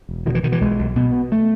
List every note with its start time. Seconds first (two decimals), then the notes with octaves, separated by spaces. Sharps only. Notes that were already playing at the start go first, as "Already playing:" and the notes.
0.09 E1
0.26 B2 D#3
0.35 E3
0.43 B2 D#3
0.52 E3
0.61 B1 G#3
0.79 B1
0.96 B2 B3
1.13 B2
1.32 A3